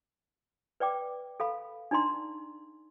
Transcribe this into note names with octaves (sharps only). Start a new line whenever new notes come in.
B4 D5 G5 D6
A4 F5 B5
D4 D#4 D5 A#5 C6